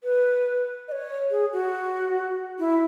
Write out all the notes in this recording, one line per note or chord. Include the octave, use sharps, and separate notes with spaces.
B4
D#5
C#5
G#4
F#4
E4